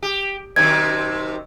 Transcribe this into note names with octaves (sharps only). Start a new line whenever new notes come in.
G4
F#2 C3 D#3 G#6